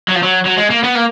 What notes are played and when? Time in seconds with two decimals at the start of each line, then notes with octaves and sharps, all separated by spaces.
0.09 F#3
0.16 F3
0.23 F#3
0.45 F#3
0.58 G#3
0.70 A#3
0.83 B3
0.95 A#3